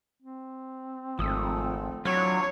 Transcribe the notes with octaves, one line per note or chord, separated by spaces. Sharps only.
C4
G#1 F3 A3 D#6 E6
F#3 D4 E4 F4 C#5